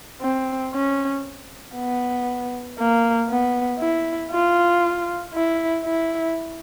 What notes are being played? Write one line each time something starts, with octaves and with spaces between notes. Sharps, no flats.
C4
C#4
B3
A#3
B3
E4
F4
E4
E4